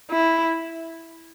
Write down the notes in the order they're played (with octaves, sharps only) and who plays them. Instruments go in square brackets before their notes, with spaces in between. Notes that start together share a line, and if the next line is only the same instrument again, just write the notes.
[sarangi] E4